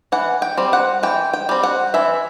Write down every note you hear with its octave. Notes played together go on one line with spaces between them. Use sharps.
E3 F#5
G5
G3 C4
F#5
E3 G5
G5
G3 C4
F#5
E3 E5